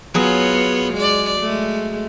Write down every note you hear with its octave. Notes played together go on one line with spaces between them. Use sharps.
F#3 B3 F4 G#4 C#5
G#3 D5
G#3 A3